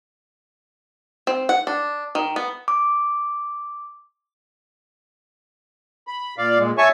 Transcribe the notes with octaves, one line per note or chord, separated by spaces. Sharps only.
C4
F#5
D4
D#3
B3
D6
B5
A#2 D5 F5
A#2 G#3
C#5 E5 G#5 A5 C#6